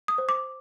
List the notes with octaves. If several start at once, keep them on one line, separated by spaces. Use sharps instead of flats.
D#6
C5
D6